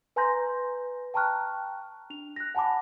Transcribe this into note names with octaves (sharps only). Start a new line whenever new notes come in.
B4 G#5 A#5 C6 G6 A#6
G5 A5 A#5 C#6 F6 F#6
D4 F7
F#6 A#6
F#5 G#5 A5 B5 D6